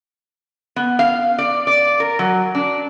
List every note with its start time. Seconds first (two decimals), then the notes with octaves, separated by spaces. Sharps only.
0.76 B3
0.99 F5
1.39 D5
1.67 D5
2.00 A#4
2.19 F#3
2.55 D4